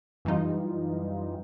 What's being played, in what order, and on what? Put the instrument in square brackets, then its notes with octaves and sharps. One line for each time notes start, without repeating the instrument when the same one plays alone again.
[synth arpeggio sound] F#2 E3 G3 D#4 F4